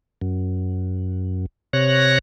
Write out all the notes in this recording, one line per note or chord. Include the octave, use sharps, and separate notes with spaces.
F#2
C3 C#5 F#6 A#6